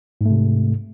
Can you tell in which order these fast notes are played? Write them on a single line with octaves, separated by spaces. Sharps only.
G#2 A3 C3